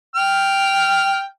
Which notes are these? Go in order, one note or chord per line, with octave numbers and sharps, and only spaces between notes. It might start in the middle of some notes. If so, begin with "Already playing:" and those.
G5 F6